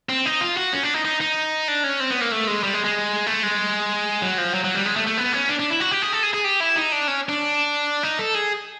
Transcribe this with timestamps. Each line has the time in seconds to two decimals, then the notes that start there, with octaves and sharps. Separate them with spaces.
0.09 C4
0.26 D#4
0.41 F4
0.57 F#4
0.73 C#4
0.83 D4
0.94 D#4
1.05 D#4
1.21 D#4
1.68 D4
1.84 C#4
2.00 C4
2.10 B3
2.21 A#3
2.32 A3
2.47 G#3
2.63 G3
2.74 G#3
2.84 G#3
3.27 A3
3.43 G#3
4.22 F#3
4.38 F3
4.54 F#3
4.64 F#3
4.75 G3
4.86 G#3
4.96 A3
5.07 A3
5.17 B3
5.33 C#4
5.49 D4
5.59 D4
5.70 E4
5.80 F#4
5.91 G4
6.02 G#4
6.13 A4
6.23 G#4
6.34 G#4
6.44 G4
6.60 E4
6.76 D#4
6.92 D4
7.08 C#4
7.29 D4
8.03 D#4
8.19 A4
8.35 G#4